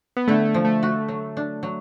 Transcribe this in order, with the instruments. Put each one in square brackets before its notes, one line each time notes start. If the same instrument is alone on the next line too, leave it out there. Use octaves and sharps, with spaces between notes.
[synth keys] B3
[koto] D3 [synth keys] A3
[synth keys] A3
[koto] F3
[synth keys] A3
[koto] F#4
F#3
D4
F#3